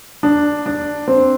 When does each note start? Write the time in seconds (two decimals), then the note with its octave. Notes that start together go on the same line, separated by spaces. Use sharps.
0.23 D4
0.66 D4
1.08 C4